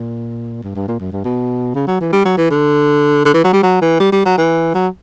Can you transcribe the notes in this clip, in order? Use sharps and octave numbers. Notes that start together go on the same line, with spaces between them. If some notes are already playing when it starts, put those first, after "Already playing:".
Already playing: A#2
G2
G2
A#2
F#2
G2
B2
C#3
F#3
E3
G3
F#3
E3
D3
D3
E3
F#3
G3
F#3
E3
G3
G3
F#3
E3
F#3